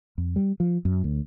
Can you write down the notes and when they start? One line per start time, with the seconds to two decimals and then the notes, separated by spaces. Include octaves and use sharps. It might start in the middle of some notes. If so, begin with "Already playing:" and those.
0.18 F2
0.36 G3
0.60 F3
0.85 F#2
1.04 D2